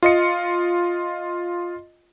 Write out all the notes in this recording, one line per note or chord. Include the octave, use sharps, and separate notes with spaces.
F4 D#5 C#7